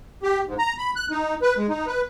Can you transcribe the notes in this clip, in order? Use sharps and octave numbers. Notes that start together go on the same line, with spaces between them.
G4
G#2
A#5
B5
F#6
D#4
B4
G#3
D#4
B4